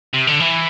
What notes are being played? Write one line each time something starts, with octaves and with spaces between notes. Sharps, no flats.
C3
D3
E3